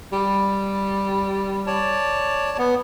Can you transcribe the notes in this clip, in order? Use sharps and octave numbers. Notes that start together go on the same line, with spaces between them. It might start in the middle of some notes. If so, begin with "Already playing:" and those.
G3
C#5 D5 A5
B3